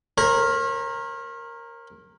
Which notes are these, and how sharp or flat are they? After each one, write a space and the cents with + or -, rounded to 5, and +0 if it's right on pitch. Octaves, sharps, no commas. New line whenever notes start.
A#4 +0 C#5 -45 B5 -25